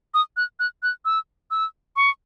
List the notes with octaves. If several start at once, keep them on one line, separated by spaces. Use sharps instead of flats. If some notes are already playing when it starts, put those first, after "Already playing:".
D#6
F#6
F#6
F#6
E6
E6
C#6